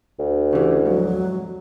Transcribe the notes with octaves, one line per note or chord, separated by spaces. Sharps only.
D2
C#3 E3 G4
F2 G#2 F#3